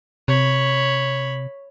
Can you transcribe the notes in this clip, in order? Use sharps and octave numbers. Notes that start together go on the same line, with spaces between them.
C3 C#5 B5